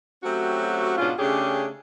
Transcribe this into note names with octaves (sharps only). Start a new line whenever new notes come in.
F#3 A3 C4 C#4 F#4 G4
G#2 B2 C#4 D4 F4
C#3 A3 C#4 D4 G4 G#4